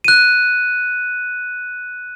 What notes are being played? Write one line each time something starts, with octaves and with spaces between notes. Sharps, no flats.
F#6 D#7